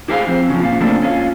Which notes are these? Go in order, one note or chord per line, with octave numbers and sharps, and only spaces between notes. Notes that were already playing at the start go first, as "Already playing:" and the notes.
E4 G4 G#4 C5 D#5 F5
F2 C4
C#3 F3
A#2 F5
C#3 A3 A#3 C4 D4
C#4 F4